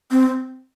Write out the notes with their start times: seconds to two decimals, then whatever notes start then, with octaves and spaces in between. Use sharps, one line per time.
0.11 C4